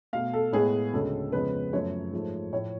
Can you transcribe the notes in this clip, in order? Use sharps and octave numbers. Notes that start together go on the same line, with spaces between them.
B2 A3 F5
A4
A2 G#3 B3 G#4
D2 C#3 G#3 A4
F2 C#3 G#3 B3 B4
F#2 F3 A3 C#5
G#2 F3 A3
A2 F3 A3 C#5